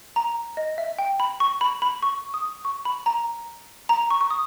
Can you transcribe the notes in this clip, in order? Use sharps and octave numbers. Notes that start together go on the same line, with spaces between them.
A#5
D#5
E5
G5
B5
C#6
B5
B5
C#6
D#6
C#6
B5
A#5
A#5
C#6
C#6
D#6